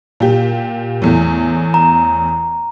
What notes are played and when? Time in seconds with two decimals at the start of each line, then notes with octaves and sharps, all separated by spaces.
0.20 A#2 G4
1.02 E2 A2
1.74 A#5